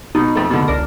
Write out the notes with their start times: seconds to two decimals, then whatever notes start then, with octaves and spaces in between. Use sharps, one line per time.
0.15 B2 D#4
0.35 F2 A3
0.50 B2 D3
0.68 C#2 D4 A#4